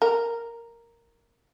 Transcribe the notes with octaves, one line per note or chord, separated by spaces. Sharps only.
A#4